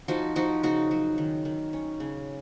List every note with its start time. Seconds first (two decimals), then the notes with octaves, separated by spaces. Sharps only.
0.08 F3 D#4 F#4
0.36 F3 D#4 F#4
0.63 C#3 D#4 F#4
0.91 F#3
1.18 D#3
1.45 D#3
1.73 C#4
2.00 C#3